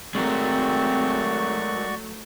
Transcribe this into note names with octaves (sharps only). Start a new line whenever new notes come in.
F#3 G#3 A3 C4 F#4 A#4 D5 C#6